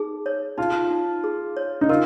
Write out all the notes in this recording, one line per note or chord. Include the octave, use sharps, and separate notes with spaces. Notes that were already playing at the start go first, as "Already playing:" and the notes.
Already playing: D#4 G#4
C#5
D#4 F4
D#4
G#4
C#5
D#4
F4 A#4